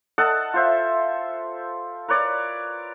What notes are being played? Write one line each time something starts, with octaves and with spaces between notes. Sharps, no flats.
A4 D#5 F#5 A5
F4 C5 E5
A#4 B4 C#5 D5